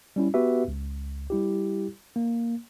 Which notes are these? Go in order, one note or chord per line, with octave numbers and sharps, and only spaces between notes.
G3 C#4 E4
B3 F#4 G4 B4 E5
C#2
G3 E4 G4
A#3